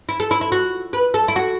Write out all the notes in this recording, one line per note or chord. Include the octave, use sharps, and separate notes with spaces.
E4
A4
E4
E4
F#4
B4
A4
E4
F#4